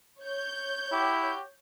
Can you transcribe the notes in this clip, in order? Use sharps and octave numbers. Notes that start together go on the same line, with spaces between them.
C#5 G6
E4 F#4 G4